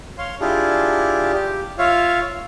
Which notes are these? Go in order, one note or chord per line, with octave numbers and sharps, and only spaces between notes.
C#5 F5 C6
D4 E4 F4 G4 G#4
G4
F4 C#5 E5 F5